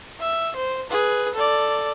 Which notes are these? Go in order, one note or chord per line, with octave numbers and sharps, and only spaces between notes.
E5
C5
G#4 B4
A4 D5